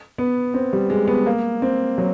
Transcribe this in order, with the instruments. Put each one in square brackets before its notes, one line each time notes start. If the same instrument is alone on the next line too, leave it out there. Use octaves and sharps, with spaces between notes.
[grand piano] B3
C4
G3
G#3
B3
A#3
C4
F#3